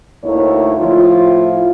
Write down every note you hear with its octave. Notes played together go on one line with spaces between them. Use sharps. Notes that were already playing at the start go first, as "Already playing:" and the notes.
D2 A3 A#3 D#4 E4 C#5
A2 F3 E4 F4